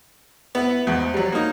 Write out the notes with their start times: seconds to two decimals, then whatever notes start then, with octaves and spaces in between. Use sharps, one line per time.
0.55 B3 E4
0.87 E2 G#2
1.13 F#3 G3
1.32 A#3 D#4